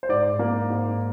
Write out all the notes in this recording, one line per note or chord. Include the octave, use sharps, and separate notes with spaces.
C5
G#2 D5
A#3
G#2